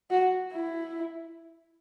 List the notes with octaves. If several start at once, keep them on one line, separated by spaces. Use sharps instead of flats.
F#4
E4